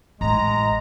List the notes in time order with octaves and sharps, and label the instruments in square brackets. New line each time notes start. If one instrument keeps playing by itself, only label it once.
[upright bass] A1 E4 [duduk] G#3 [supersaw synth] A#5